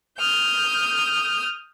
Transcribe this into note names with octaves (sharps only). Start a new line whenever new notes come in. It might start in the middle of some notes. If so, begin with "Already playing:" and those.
D#6 F6 G6